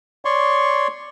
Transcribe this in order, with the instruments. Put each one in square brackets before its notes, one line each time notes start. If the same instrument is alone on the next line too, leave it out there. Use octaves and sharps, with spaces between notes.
[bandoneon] C#5 D5 C6 C#6